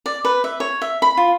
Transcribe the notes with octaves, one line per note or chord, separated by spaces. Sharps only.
D5
B4
E5
C#5
E5
B5
F4